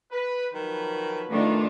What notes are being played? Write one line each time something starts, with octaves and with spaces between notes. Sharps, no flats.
B4
D#3 F3 F#3 B4
D#3 A3 D4 F4